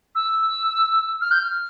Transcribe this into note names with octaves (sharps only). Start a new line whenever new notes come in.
E6
F6
G6
F6